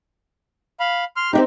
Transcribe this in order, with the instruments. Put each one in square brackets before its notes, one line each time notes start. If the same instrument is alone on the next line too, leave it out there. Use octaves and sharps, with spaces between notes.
[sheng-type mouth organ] F5 B5
C6 F6
[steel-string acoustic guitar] C4 D4 D#4 [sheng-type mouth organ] G4